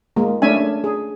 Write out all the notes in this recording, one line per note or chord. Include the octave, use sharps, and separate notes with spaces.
G#3 A#3
A3 C#4 D4 E5 G#5
G#4